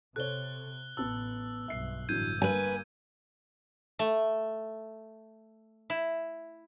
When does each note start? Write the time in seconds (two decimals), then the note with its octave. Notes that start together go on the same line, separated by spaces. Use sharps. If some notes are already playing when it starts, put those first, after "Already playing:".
0.16 C3 A4 C5 C#5 F#6 G7
0.97 A1 B3 A5 E6
1.68 B1 G2 E5 C7
2.09 G1 A2 E3 F#3 D4 G6 G#6 D#7
2.42 G2 A#3 B4 G#5
3.99 A3
5.90 E4